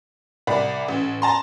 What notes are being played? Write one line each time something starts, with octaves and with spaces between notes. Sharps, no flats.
C2 D5 B5
A1
A5 A#5 C6